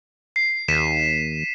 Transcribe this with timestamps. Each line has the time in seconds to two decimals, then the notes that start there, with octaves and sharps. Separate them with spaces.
0.36 C7
0.68 D#2 B6 D#7 E7